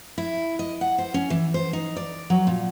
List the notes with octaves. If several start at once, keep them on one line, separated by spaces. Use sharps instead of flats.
E4
D#5
F#5
C5
C#4
E3
C5
D#4
D5
F#3
A#2